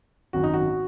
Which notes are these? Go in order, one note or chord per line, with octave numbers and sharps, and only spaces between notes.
G#1 F#2 D#3 F#4
D#4
F#4